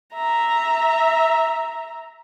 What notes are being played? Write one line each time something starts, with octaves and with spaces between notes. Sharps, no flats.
E5 A#5